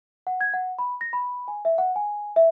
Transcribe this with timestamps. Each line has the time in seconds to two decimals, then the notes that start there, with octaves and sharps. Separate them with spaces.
0.27 F#5
0.41 G#6
0.54 F#5
0.79 B5
1.01 A#6
1.13 B5
1.48 G#5
1.65 E5
1.78 F#5
1.96 G#5
2.36 E5